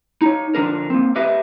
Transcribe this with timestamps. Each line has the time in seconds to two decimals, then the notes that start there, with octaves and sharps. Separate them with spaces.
0.21 D#4 C#5
0.55 D3 F3 D4 A#4
0.90 A#3 C4
1.16 G4 B4 D#5 E5